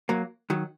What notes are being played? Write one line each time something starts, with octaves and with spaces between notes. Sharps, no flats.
F#3 A#3
D#3 F#3